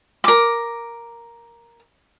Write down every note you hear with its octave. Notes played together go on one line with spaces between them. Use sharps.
A#4 D6